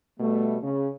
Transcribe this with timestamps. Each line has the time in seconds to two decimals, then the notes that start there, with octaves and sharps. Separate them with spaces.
0.20 B2 G3 A3
0.62 C#3